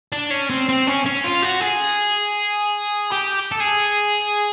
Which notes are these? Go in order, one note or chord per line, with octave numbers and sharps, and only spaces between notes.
D4
C#4
C4
C4
C#4
C#4
F4
F#4
G#4
G4
A4
G#4